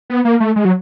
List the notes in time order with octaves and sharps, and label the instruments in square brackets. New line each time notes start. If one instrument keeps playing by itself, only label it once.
[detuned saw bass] B3
A#3
A3
G#3
F#3